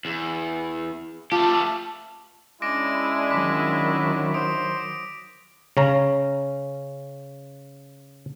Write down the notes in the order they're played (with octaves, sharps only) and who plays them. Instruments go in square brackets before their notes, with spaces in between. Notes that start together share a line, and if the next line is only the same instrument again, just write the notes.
[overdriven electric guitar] E2
[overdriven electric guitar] A3 G4 [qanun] F4 [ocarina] A5
[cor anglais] G#3 [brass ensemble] C#4 D4 E4 [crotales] D6 A#6 D7
[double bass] D#3 F#3 [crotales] D6 B6
[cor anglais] C5 [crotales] D#6 D7
[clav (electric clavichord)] C#3 C#4 A#5